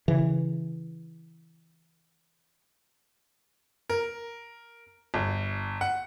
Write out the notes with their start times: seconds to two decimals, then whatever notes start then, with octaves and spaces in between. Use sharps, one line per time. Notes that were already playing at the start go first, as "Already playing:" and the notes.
0.08 C#3 E3
3.90 A#4
5.14 G1
5.81 F#5